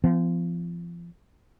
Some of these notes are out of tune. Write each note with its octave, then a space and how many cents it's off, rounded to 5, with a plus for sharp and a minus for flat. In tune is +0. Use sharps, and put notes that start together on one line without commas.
F3 -30 B3 +35